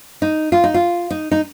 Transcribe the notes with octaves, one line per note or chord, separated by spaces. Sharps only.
D#4
F4
D#4
F4
D#4
D#4